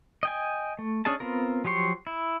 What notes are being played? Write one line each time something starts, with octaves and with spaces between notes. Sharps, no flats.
D#5 G5 G#5
A3
C#4 D4 G#4 D#5 A5
B3 C4 F4 A#4
F3 F#3 G4 C6 C#6
E4